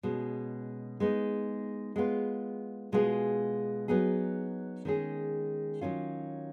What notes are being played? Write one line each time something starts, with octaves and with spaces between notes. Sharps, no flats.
B2 G#3 C#4
G#3 B3 D#4
G#3 B3 F4
B2 G#3 B3 F4 G#4
F#3 B3 D#4 G#4
D#3 G#3 C#4 G#4
D#3 F#3 C#4 F4